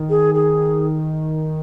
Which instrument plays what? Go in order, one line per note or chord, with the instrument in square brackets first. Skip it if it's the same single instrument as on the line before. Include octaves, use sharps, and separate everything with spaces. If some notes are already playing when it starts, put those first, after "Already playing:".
Already playing: [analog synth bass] D#3
[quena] G#4
G#4